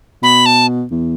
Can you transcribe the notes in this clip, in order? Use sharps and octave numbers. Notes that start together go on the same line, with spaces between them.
B2 B5
A5
E2